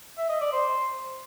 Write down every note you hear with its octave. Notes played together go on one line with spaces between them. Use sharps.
E5
D#5
D5
C5